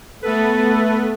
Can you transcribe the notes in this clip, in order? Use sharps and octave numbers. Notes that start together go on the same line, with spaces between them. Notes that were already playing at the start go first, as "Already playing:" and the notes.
A3 B3 A4 B4